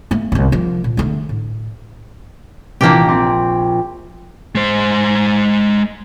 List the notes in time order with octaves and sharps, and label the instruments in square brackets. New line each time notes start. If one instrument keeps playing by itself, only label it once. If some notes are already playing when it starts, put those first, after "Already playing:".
[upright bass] A3 A#3
D#1 C2
F3 A#3
A#2
D3 A3
A2
[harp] A#1 [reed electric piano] C3 E3 [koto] A#3 D4 G4
[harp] C4 [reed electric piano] D6
[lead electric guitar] G#3 C5